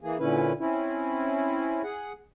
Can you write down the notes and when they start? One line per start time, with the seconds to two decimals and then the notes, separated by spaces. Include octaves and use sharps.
0.01 E3 A#3 G#4
0.19 A#2 D3 C#4 E4 B4
0.60 C4 C#4 E4
1.83 G#4 F#5